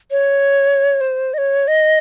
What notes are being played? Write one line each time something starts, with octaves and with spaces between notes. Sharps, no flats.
C#5
C5
D#5
C#5
D#5